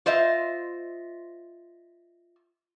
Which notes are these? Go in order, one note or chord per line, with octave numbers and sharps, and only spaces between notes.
F4 C5 D#5 E5